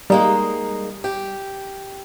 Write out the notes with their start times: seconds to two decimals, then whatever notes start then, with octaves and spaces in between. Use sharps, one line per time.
0.10 G3 G#3 A#3 D#4
1.04 G4